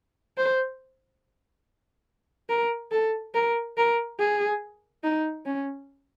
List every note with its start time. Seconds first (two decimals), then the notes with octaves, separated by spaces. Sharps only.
0.38 C5
2.49 A#4
2.91 A4
3.34 A#4
3.77 A#4
4.19 G#4
5.04 D#4
5.46 C#4